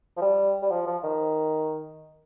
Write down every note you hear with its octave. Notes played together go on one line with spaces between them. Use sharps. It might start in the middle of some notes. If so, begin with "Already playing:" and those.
F3
G3
G3
F3
F3
D#3